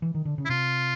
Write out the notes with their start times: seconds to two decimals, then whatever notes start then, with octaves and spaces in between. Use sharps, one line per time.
0.02 E3
0.15 D#3
0.25 D3
0.38 C#3
0.45 E4
0.49 C3 F4